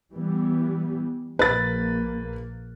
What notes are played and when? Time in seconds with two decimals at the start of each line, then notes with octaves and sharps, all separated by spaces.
0.13 E3 G3 B3
1.39 A#1 A#3 B4 A6